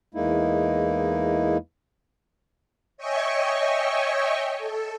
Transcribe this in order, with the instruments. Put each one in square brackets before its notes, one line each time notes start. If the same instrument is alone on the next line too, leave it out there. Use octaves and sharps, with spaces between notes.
[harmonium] E2 G#3 A#3 D#4 E4
[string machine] C#5 D#5 E5 G5 G#5 C#6
A4